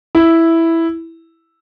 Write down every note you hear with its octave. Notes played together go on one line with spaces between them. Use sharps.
E4